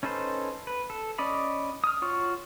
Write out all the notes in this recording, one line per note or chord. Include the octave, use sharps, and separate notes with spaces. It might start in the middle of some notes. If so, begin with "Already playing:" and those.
C#4 D#4 A4 B4 C5
B4
A4
C#4 D5 D#5 B5
D#6 F6
F4 F#4 C#5 C#6 F6